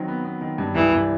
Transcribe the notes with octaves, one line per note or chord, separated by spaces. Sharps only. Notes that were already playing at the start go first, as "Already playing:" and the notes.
Already playing: D#3 F#3 C4
B3
B3
D#3
G2
C2 E3
C2